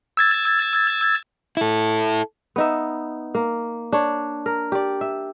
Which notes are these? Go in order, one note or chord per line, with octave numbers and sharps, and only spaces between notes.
E6 G#6 A6
E4 A4
B3 D#4 E5
A#3
D4 C#5
A#4
G4 D5
E5